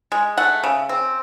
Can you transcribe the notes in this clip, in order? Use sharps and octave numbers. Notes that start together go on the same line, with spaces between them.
G#3
A3 F#5
C#3
C4